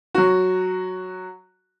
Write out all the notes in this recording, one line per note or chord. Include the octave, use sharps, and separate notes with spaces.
F#3 F#4